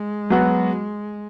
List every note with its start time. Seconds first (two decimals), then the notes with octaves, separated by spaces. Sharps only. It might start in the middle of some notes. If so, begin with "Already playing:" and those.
Already playing: G#3
0.30 F#3 B3 F#4